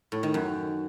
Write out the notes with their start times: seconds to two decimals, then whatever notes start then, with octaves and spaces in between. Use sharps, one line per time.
0.12 A2
0.23 D#3
0.34 F#2